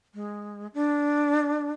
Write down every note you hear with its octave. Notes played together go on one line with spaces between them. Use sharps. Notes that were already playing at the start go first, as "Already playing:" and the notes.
G#3
D4